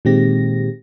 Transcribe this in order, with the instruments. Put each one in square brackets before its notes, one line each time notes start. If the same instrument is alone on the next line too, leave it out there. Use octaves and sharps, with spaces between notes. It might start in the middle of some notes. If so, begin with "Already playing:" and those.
[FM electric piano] A#2 D#3 G#3 C4 G4 A#6